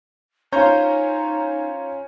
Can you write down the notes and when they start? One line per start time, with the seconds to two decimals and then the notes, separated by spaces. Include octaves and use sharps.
0.52 C#4 D#4 F4 C5 C#5 A#5 G6